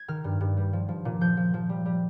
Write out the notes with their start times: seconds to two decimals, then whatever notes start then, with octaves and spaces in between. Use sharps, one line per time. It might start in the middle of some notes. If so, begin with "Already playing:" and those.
Already playing: G#6
0.08 D#3 F6
0.24 G2
0.41 G2
0.57 G3
0.73 F3
0.89 F3
1.05 A#2
1.21 F3 G6
1.37 F3
1.54 F3
1.69 G3
1.85 G3